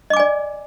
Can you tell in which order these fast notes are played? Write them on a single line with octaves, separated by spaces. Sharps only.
D#5 D6 G#5 D5